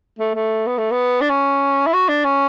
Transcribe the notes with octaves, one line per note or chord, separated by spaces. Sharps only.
A3
A3
B3
A3
B3
D4
C#4
E4
F#4
D4
C#4